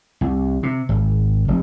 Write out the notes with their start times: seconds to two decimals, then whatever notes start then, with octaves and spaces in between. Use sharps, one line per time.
0.21 C2
0.63 C3
0.89 G#1
1.48 F1